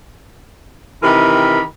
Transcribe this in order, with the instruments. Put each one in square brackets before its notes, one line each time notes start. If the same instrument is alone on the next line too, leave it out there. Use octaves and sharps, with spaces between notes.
[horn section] C3 D#3 E3 A#4 B5